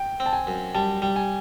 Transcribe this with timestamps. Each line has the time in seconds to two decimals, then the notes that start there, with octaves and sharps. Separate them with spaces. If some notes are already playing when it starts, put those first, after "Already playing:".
Already playing: G5
0.20 C4
0.26 A5
0.33 G#5
0.47 F#2
0.74 G3 A5
1.02 G3
1.16 G#5